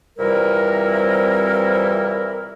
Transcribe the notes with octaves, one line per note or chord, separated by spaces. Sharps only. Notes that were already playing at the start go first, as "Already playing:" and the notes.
F2 C3 E3 G3 E4 A#4